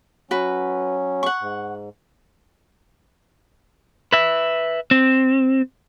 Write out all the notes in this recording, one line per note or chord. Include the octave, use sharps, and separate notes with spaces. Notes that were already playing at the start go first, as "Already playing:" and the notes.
F#3 C#4 F#4 B4
F#5 C#6
G#2
B4 E5
C4